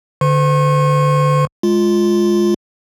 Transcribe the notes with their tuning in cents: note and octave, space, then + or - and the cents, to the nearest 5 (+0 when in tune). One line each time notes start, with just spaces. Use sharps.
D3 +0 C5 -45 C#6 -45
G#3 +0 F4 +0